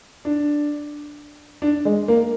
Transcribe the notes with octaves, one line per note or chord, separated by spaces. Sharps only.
D4
D4
G#3
A#3